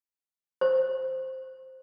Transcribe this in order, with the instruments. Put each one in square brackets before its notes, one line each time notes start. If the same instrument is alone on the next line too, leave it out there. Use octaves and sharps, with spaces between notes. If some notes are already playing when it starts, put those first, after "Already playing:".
[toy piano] C5